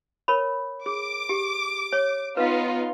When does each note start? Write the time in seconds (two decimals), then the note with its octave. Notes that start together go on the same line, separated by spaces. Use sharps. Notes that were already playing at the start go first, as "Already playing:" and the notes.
0.28 A#4 C#5 B5
0.86 G#4 D6
1.29 G4
1.93 C#5
2.37 B3 D#4 F4 B4 F5